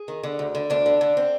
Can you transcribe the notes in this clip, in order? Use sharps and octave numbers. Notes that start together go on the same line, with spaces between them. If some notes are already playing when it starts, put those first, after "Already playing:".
Already playing: G#4
D#3
D3
D2
D3
D2 D4
D3
D3
C4